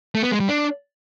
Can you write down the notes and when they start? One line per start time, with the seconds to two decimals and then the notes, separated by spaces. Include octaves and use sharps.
0.15 A3
0.23 B3
0.32 G#3
0.40 G3
0.49 D4